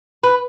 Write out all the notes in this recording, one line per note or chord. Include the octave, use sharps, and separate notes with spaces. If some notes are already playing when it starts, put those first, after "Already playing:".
B4